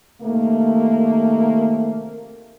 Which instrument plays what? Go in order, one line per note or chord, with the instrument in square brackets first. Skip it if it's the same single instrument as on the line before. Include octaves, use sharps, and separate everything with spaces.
[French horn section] C3 D#3 A3 A#3